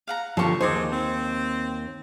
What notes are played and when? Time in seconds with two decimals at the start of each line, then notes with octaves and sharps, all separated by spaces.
0.07 F5 F#5 A#5
0.37 G2 A#2 D3 F3 A4 C5 C#6
0.61 D#2 G#3 C4 D#4 C5 G#5 C6 D6
0.90 C4